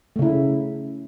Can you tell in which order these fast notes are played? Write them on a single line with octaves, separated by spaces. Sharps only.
A3 C#3 E4